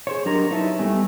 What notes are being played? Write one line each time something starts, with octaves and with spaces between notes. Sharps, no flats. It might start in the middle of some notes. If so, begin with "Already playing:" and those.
G#4 C5 C#5
F#3 D4 G4 A#4 D#5 A#5
D#4 E4 B4 C#5 E5 A5
G3 A3 B3 G#5